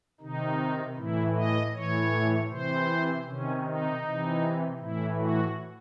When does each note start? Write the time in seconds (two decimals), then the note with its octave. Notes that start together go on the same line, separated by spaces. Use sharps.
0.21 C3 D#3 D#4
0.97 A2 E3 E4
1.36 D#5
1.74 A2 E3 C#5
2.50 C3 E3 C5
3.26 C3 D#3 C#4
3.65 D#4
4.02 C3 E3
4.79 A2 E3 E4
5.18 F#4